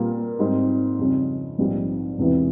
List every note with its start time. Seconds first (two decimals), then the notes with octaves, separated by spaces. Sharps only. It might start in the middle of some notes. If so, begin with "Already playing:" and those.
Already playing: A#2 G3 A#3 F4
0.39 G#2 G3 C4
0.99 F2 C#3 G3 C#4
1.58 A#1 G#2 G3 C4
2.18 E1 E2 C3 E3